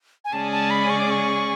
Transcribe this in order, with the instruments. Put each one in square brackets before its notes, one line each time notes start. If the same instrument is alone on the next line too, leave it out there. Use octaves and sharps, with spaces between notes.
[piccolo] G#5
[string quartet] C#3 G#3 C#4 G#4 D5 [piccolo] A5
[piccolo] A5
B5
C#6
D6
C#6